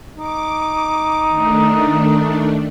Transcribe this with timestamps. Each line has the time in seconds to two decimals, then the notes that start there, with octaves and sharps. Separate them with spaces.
0.18 D#4 D6
1.29 D#3 A3 D4